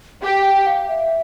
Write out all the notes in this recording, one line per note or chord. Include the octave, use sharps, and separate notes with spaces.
G4 G5
G5
F5
E5